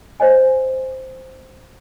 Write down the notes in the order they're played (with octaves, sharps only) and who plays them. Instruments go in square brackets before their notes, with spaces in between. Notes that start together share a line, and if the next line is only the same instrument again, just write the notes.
[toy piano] C5 C#5 D#5 G#5